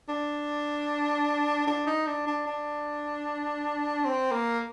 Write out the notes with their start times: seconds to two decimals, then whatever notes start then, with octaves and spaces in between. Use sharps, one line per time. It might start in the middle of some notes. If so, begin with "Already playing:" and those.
0.09 D4
1.67 D4
1.87 D#4
2.07 D4
2.27 D4
2.47 D4
4.05 C4
4.32 A#3